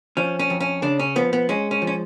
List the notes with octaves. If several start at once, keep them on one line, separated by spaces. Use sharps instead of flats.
F3 C#4
C#4
F2
C#4
C#3 D4
C#4
F3 B3
B3
G#3 C#4
C#4
F3
C#4